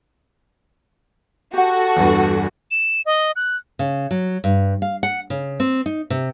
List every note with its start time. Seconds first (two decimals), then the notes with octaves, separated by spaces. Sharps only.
1.53 F#4 G4 A4 F#5
1.96 E2 G2
2.71 E7
3.06 D#5
3.36 F#6
3.79 C#3
4.11 F#3
4.44 G2
4.82 F5
5.03 F#5
5.30 C#3
5.60 C4
5.86 D#4
6.10 C3